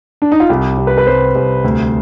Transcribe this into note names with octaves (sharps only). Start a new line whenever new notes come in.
D4
D#4
F4
C2 G4
C3
B4
B4
C2 C5
C2
D2